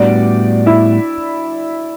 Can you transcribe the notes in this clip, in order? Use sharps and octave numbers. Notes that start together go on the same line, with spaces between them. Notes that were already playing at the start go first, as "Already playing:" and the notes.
Already playing: A2 G3 B3 D4 F#4 D5
E4 E5